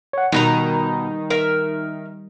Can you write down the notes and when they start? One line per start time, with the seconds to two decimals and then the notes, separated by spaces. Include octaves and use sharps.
0.13 C#5 F#5
0.32 B2 D#3 G3 D#4 A4 A#5
1.30 A#4 E5